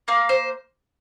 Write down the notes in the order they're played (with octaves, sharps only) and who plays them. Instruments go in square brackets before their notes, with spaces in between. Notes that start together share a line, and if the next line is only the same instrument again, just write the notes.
[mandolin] A#3 F5
C5